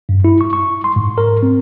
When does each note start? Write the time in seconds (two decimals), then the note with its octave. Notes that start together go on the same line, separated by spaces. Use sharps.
0.09 G2
0.24 E4
0.41 C#6
0.53 C#6
0.84 C6
0.96 G#2
1.18 A#4
1.43 C4